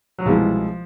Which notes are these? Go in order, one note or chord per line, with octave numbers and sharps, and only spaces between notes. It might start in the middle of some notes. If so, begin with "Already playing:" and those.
F#3
C2 B2 F3 G#3 B3 E4